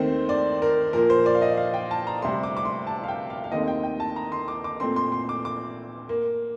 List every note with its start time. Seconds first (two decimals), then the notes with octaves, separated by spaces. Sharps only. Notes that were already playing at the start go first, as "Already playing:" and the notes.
Already playing: D#2 D#3 A3 C4 C5
0.29 D5
0.62 A#4
0.93 A#2 F3 A#3 A#4
1.10 C5
1.26 D5
1.35 F5
1.42 D#5
1.57 F5
1.74 G5
1.91 A5
2.07 A#5
2.22 D2 C3 G3 C6
2.43 D6
2.57 D6
2.65 C6
2.87 A5
3.04 F5
3.08 G5
3.30 F5
3.44 F5
3.51 D#2 D#3 A3 C4 D#5
3.68 G5
3.83 G5
4.00 A5
4.16 A#5
4.32 C6
4.48 D6
4.64 D6
4.80 A#2 A3 C4 C6
4.96 C6
5.12 C6
5.29 D6
5.45 D6
6.09 A#3